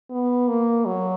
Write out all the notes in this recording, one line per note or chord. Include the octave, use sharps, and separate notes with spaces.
B3
A#3
F#3